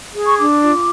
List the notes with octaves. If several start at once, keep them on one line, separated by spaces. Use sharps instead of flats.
G#4
C#6
D4 D6
F4